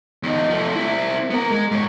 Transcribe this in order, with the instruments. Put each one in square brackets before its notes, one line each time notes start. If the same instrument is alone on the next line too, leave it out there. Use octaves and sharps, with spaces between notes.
[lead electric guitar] E2 D#4
F3 A3
C4 E4
B3 A#4
G#3
G#2 C#5